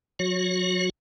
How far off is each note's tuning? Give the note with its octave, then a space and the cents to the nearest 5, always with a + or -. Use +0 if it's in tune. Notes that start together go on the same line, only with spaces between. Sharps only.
F#3 -30 F#4 -25 C#5 +0